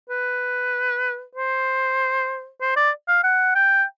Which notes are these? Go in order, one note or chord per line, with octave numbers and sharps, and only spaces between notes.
B4
C5
C5
D5
F5
F#5
G5